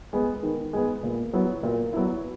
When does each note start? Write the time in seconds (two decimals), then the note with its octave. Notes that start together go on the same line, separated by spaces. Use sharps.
0.13 G#3 B3
0.43 D#3
0.73 G#3 B3
1.03 A#2
1.33 F#3 B3 E4
1.63 A#2
1.93 F#3 B3 E4